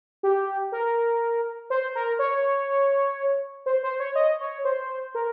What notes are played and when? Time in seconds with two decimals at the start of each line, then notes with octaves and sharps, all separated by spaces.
0.23 G4
0.72 A#4
1.70 C5
1.95 A#4
2.19 C#5
3.66 C5
3.83 C5
3.99 C#5
4.15 D#5
4.40 C#5
4.65 C5
5.15 A#4